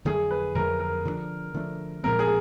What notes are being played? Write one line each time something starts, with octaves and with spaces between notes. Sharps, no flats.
F2 D3 F#3 A3 G#4
B4
F2 D3 F#3 A3 A#4
A#4
D3 F3 A3 D4
D3 F3 A3 D4
A#2 F3 G#3 C4 A#4
G#4